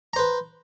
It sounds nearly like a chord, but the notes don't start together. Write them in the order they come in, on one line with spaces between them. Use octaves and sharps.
A#5 C5 B4